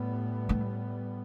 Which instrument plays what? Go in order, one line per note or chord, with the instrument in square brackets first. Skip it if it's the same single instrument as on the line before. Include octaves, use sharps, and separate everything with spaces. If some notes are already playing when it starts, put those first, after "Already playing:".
Already playing: [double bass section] A2 G3 B3
[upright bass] A3